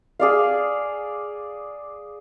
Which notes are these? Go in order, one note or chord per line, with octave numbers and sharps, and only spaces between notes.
G#4 D5 F5